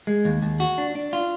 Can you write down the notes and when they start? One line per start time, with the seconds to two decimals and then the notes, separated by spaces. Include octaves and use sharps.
0.07 G#3
0.25 D#2
0.42 D#2
0.60 F#4
0.78 D4
0.95 D4
1.13 F4